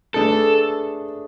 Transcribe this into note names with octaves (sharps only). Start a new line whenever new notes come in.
A3 D4 G#4 A4 B4